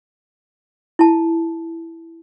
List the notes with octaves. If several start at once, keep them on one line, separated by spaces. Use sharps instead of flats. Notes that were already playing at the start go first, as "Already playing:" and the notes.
E4 A5